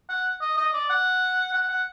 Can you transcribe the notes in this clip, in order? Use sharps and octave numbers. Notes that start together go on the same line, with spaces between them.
F#5
D#5
D#5
D5
F#5
F#5
F#5